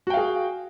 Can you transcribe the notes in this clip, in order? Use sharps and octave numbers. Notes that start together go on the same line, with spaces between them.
F#4 G#4 F5 G5